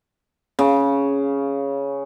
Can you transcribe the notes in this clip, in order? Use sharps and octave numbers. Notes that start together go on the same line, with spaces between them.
C#3